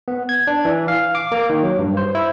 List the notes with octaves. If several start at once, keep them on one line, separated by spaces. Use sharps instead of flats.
B3
G#6
D4
E3
F5
D6
A#3
D#3
F#3
G2
C5
E4